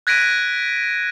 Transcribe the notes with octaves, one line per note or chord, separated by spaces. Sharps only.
F#6 G#6 A#6 B6 D7 D#7